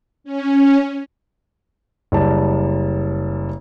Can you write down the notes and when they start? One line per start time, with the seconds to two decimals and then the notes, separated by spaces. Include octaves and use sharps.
0.24 C#4
2.12 F#1 G3 A5